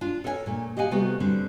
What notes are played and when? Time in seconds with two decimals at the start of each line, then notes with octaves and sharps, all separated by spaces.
0.01 D4 F4
0.24 A4 A#4 C#5 F5 G#5
0.46 A#2 A3
0.77 G4 D#5 F5 F#5 G#5
0.91 C3 G3 A3 B3 F#4 G4
1.20 D3 G3 C4 D4